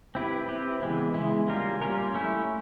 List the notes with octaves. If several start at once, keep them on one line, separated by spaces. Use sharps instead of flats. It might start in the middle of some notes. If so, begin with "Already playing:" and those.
C4 E4 G4 B4
C4 E4 G4 B4
C#3 E3 G#3 B3 E4
C#3 E3 G#3 B3 E4
G3 A#3 C#4 F4 A#4
G3 A#3 C#4 F4 A#4
A3 C#4 E4